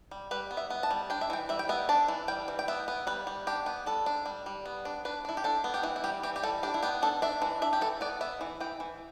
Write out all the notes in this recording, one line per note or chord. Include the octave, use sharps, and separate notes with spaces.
G3
G3 B4
B3
E5
B3
A5
G3
D4 G5
E5
E3 G5
G3 E5
G5
B3 E5
D4 A5
E3
G3 G5
E3
G5
B3 E5
B3
G3 B4
G3
D4 G4
B3
G3 A4
D4
G3
G3
B3
D4
D4 B4
D4 E4
G4
D4 A4
B3
G4
E3 E4
E4
G3 G4
E3 G4
G4
G3 A4
D4 G4
E4
B3 G4
D4 A4
D4 E5
E3
D4 E5
G4
E3 A4
B3 D5
B3 E5
E3
E3 G5
E3